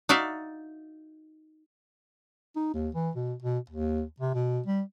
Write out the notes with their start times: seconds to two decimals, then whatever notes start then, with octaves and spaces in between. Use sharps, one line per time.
0.09 D#4 F#4 D5 E5 F5
2.56 D#4
2.74 D#2
2.95 E3
3.15 B2
3.42 B2
3.70 D#2
4.20 C3
4.34 B2
4.66 G3